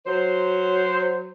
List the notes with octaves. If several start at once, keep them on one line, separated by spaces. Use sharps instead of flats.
F#3 C5